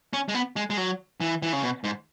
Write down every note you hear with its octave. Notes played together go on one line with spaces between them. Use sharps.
C#4
G#3
B3
G#3
G#3
F#3
E3
E3
C#3
B2
G#2